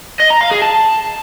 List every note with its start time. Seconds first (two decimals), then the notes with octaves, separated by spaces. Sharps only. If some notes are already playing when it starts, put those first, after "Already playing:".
0.20 D#5
0.30 A#5
0.41 F5
0.51 G#4
0.62 A5